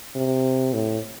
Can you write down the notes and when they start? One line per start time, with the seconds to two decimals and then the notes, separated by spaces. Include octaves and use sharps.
0.16 C3
0.73 A2